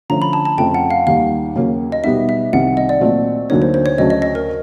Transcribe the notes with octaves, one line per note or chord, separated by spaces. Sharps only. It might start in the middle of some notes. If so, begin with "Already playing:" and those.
D3 F3 A3 C#4 A#5
B5
A5
A5
F2 C#3 F3 A3 G5
F#5
F5
D#2 D#3 G3 F5
D#2 C#3 F#3 A#3 C#4
D#5
B2 G3 B3 D#4 E5
E5
C2 C3 D#3 F#5
D#5
D5
A#2 F#3 A3 C4 F4
D2 D3 F#3 A#3 D#4 C#5
C5
C5
C#5
D2 C#3 F#3 A3 D4 D#5
D#5
D#5
A#4